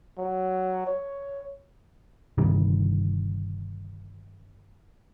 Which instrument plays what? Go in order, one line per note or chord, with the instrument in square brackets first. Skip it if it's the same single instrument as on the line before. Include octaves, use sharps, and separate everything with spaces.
[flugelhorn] F#3
C#5
[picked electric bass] G1 C3 D#3 G3